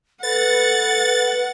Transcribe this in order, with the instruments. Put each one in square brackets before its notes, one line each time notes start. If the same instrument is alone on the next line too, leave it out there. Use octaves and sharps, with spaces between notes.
[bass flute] A4 [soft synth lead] B4 [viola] F#5 [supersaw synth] A6